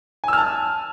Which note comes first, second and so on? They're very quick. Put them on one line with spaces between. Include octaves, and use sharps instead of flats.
G#5 E6 F6 A5